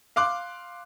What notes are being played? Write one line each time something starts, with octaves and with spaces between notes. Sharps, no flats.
F5 C6 D6 F#6